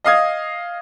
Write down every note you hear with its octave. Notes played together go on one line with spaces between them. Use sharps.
D#5 F5 D#6 G#6